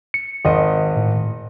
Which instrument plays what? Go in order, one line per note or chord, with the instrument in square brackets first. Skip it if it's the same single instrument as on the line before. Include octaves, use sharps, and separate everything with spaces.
[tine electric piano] C#7
[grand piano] G#1 D#5
[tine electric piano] A2